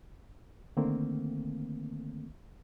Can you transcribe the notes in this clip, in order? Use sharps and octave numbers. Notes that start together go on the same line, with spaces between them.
D3 D#3 A3 A#3 C4